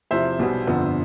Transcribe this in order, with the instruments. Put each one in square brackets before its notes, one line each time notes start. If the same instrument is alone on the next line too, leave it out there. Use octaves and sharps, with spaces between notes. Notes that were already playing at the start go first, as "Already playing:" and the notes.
[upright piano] E2 C3 F3 C5 E5
B1 B2 G3 B3
G1 F2 D3 F3 B3